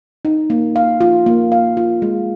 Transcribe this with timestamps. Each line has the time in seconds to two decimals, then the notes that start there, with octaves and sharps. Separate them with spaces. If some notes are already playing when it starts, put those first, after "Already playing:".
0.25 D#4
0.50 A#3
0.76 F5
1.01 F4
1.26 A#3
1.52 F5
1.77 F4
2.02 G#3